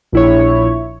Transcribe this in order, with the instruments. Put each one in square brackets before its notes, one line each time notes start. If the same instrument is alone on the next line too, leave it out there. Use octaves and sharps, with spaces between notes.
[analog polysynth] A#1 E4 C#5